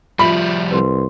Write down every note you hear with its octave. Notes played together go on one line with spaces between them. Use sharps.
F3 G3 F4 E5 B5 F#7
C2 B4 C6